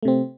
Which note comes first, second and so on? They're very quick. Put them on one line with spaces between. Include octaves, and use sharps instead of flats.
A3 C3 C4